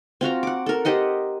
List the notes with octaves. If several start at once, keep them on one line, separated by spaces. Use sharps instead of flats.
C4 F4 F#4 A#5
F#5 D6
A4 A#4
G4 C5 D#5 F#5